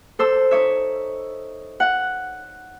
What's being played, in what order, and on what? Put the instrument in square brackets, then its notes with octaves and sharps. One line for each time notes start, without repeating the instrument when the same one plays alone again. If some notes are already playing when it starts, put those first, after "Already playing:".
[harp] A4 C5 E6
D#4 C#5 E5
F#5